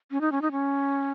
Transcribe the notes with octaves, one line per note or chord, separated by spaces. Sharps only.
C#4
D#4
C#4
D#4
C#4